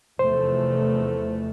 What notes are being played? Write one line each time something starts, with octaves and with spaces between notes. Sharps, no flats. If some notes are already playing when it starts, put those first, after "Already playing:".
F1 E2 A3 C5